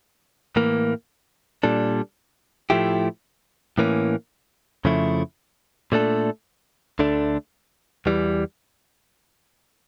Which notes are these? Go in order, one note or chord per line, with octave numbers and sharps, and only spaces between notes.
A2 E3 A#3
A#2 G3 D4 A4
A2 F3 A3 E4 G4
A2 E3 A#3 C#4
F2 C#3 F3 A3 E4
A#2 A3 D4 A4
D2 D3 A3 D4
E2 E3 G3